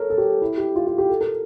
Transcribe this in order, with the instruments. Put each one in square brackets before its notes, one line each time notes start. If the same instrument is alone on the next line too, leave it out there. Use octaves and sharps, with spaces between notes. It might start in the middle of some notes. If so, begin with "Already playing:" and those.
Already playing: [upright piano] A4 A#4 C#5
A4
G4
E4
G4
F4
F4
G4
A4
A#4